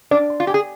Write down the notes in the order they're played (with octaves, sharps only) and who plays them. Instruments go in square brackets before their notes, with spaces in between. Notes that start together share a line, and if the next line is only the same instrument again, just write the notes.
[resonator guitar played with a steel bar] D4 [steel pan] D5
[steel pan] C6
[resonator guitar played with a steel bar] F4
G4
[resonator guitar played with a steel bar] G#4 [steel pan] G#5